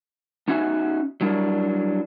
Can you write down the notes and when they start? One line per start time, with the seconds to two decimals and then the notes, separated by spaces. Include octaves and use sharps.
0.48 B3 C#4 D#4 F#4 E5 G#5
1.21 F#3 G3 D4 E4 A#4